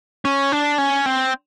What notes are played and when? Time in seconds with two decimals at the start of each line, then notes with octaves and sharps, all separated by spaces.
0.25 C#4
0.52 D4
0.78 C#4
1.06 C4